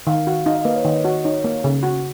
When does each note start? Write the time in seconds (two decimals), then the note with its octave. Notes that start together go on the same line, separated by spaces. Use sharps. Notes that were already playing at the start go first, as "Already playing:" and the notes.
0.07 D#3 F5
0.27 F#4
0.46 D#4 F5
0.56 D#5
0.65 A#3 B4
0.76 C#5
0.85 D#3 D#5
1.05 F#4
1.24 D#4 C#5
1.44 A#3
1.64 C#3
1.83 F#4